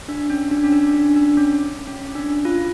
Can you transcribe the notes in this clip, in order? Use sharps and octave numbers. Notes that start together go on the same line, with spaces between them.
D4
C#4
D4
C#4
D4
D4
D4
C#4
C#4
D4
F4